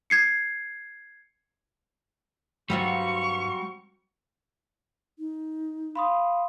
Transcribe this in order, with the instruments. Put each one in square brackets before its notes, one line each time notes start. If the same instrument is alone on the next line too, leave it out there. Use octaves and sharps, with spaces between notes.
[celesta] G#6 C7 C#7
[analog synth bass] G2 [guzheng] F#3 C4 F4 [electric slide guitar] G3 F#4 [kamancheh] C#6
[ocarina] D#4
[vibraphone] F5 [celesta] B5 C6 D#6